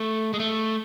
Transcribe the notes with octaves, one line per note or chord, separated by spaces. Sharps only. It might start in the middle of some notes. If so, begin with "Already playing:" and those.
Already playing: A3
G#3
A3